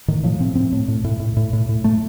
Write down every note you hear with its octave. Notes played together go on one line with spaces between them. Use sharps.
A2 D#3
A2 F3
A2 C4
A2 C4
A2
A2
A2
A2
A2
A2
A2
A2 A3